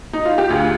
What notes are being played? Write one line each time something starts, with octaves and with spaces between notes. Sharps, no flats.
D#4
F4
G4
D2 F4 G#4